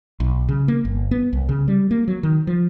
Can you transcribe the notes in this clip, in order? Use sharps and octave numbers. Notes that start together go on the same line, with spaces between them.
B1
C#3
A#3
G1
B3
C2
C#3
G3
A#3
F#3
D#3
F3